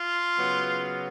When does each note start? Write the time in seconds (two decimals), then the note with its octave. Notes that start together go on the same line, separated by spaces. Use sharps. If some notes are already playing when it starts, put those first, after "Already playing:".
Already playing: F4
0.35 C#3 F#3 B3